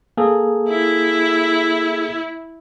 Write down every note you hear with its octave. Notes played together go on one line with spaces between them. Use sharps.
A#3 G#4 A4
E4